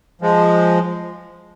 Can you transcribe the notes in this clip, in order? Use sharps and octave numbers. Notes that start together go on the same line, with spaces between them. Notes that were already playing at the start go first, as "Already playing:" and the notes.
F3 G#3